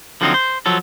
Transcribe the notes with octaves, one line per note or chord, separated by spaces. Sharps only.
D3 F3 F#3 C4 C#4 D#4
C5
F3 F#3 A4